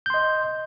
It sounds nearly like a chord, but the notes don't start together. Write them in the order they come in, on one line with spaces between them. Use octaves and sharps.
G6 C6 D#5